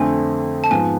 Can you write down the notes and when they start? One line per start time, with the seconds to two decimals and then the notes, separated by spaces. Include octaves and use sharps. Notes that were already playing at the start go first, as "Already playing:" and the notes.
Already playing: F2 D3 A3 C4 G#5
0.64 A5
0.71 G#2 F3 B3 G#5